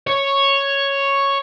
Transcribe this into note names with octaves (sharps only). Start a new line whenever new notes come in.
C#5